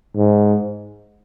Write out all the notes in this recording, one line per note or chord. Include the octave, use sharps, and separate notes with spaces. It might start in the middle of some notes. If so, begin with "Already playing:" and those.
G#2